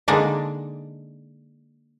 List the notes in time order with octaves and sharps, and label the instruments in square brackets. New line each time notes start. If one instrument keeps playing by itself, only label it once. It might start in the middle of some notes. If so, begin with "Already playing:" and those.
[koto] D3 G#3 A#3 D4 D#4